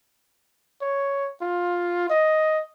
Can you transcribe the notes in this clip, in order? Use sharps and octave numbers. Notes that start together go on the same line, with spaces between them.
C#5
F4
D#5